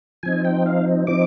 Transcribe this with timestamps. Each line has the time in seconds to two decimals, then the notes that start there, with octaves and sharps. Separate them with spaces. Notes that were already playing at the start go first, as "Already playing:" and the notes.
0.23 F3 C4 D#4 G#5
0.45 G5
0.66 F5
1.07 F3 C4 D#4 D6